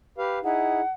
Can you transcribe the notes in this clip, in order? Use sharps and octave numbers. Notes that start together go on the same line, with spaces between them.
G4 B4 F5
D#4 E4 G#4 F#5